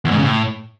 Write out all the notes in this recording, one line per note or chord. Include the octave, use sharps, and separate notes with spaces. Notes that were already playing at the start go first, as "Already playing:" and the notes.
E2
G#2
C#3
A2